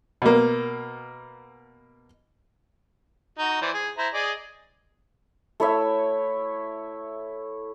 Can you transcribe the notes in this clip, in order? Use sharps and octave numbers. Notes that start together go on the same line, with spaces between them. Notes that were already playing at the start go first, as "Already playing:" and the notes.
B2 A#3
D#4 F#4 A#5
E3 C5 D5
G#4
E4 C5 A#5
G#4 D5 D#5
A3 E4 C#5 E5